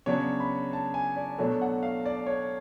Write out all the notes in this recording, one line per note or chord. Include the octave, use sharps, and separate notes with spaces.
C#3 F#3 B3 D4 C#5
B5
A5
G#5
D5
B2 F#3 A3 D4
F#5
F5
D5
C#5